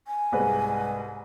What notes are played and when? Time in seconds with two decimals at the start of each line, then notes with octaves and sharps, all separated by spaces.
0.08 G#5
0.32 C2 G#2 B4